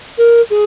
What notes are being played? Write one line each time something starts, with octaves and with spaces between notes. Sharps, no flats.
A#4
G#4